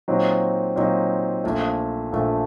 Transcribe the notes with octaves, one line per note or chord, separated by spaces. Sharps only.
A#2 F#3 C4 D#4
A#2 F#3 C4 D#4
A#1 A#2 A3
A#1 A#2 A3